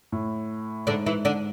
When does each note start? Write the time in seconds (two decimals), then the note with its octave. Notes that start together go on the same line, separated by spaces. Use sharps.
0.12 A2
0.87 G#2 D3 D4
1.06 E3 E4
1.25 D3 D4